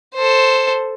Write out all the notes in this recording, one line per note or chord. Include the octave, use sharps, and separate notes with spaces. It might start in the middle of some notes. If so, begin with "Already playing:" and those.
A4 C5